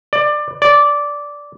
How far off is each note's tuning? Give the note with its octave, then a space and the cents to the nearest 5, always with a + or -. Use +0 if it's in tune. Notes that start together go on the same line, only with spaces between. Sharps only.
D5 +20
D5 -10